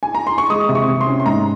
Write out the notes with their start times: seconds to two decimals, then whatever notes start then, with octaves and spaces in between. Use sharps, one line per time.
0.03 G#5
0.15 A#5
0.27 C6
0.38 C#6
0.50 G#3 D#6
0.69 C3
0.75 C#6
0.88 C3
1.01 C6
1.07 C#4
1.20 C6
1.26 G#2 A#5